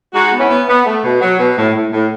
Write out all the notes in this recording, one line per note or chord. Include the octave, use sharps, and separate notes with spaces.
G#3 D#4 F#4
B3
C#4 E4
B3
B3
A3
B2
F#3
B2
A2
A2
A2